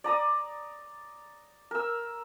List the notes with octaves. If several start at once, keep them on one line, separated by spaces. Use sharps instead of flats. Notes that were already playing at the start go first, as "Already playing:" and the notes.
D5 A#5 D#6
A#4 E6